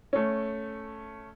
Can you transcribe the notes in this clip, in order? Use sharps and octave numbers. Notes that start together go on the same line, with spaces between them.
A3 C#4